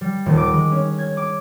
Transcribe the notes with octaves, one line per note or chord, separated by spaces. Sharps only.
G3
D#1
D6
G#3
C#4
G#6
D6